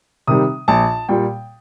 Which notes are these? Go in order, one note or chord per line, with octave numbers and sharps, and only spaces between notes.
C3 D#3 G3 D#6
A#1 A5
A#2 G3 G5